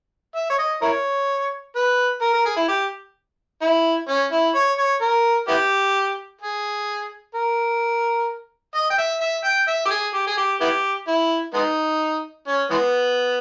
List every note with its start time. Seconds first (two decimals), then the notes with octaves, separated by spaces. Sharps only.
0.35 E5
0.50 C#5
0.58 D#5
0.82 E4 A#4 C#5
1.76 B4
2.22 A#4
2.33 A#4
2.45 G#4
2.57 E4
2.68 G4
3.62 E4
4.08 C#4
4.32 E4
4.55 C#5
4.78 C#5
5.01 A#4
5.48 B3 E4 G4
6.41 G#4
7.35 A#4
8.75 D#5
8.90 G5
8.98 E5
9.21 E5
9.44 G5
9.68 E5
9.85 G4
9.91 G#4
10.14 G4
10.27 G#4
10.37 G4
10.60 B3 E4 G4
11.08 E4
11.54 G#3 B3 D#4
12.47 C#4
12.70 E3 G#3 B3